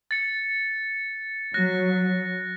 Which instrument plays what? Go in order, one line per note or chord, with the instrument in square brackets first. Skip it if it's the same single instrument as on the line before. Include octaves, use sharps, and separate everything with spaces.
[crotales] A6 C#7
[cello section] F#3 [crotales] F#6 A#6